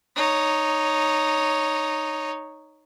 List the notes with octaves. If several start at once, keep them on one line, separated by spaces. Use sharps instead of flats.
D#4 C#5